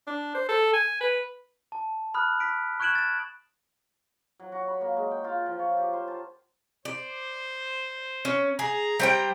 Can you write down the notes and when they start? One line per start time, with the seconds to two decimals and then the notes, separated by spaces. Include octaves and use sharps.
0.07 D4
0.35 C5
0.49 A4
0.73 G#5
1.01 B4
1.72 A5
2.14 B5 D#6 F6 F#6
2.40 B6 D7
2.80 C#6 F#6 G#6 D7 E7 F#7
2.95 A6 E7
4.40 F#3
4.52 F#4
4.68 B5
4.81 A#3
4.97 G#3
5.11 G5
5.24 F4
5.46 F3
5.59 C#5
5.77 G4
5.93 C5
6.08 A5
6.85 C5 D5
8.25 C#4
8.59 G#4 A#5
9.00 G3 C5 G5